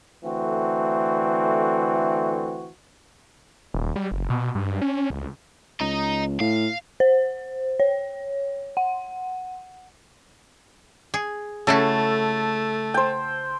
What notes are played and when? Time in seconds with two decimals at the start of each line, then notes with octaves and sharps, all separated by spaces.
0.24 D3 E3 A3 C4 F#4
3.74 D#1
3.96 G3
4.11 F#1
4.30 B2
4.55 G2
4.82 C#4
5.10 C#2
5.81 C#2 D#5 A#5
6.40 A2 F5
7.00 C5
7.80 C#5
8.77 F#5
11.14 G#4
11.67 C#3 A3 E4 F#4 A4
12.94 C5 G5